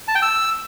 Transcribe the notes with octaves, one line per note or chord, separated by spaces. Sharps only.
A5
G5
E6